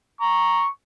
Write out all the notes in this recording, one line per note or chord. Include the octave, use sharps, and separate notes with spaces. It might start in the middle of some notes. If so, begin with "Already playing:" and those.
A#5 C#6